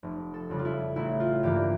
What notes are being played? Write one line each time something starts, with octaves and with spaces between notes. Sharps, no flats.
F1
A4
F2 C#3 G3
F4
E4
A1 E4
F4
G2 E3 A#3 G4